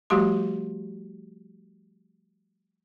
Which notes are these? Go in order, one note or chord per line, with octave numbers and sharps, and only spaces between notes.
F3 G3 A3 F#4 G4 C6